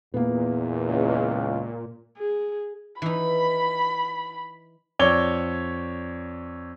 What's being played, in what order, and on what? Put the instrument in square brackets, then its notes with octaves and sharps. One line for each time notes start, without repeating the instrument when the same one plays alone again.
[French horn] E2 [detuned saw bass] A#2 [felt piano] A#3 B3
[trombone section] C#2
[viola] G#4
[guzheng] E3 D#4 [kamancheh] B5
[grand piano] F2 C#5 D5 G7